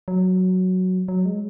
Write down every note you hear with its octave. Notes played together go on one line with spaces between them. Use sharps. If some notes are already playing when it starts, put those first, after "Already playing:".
F#3
F#3
G#3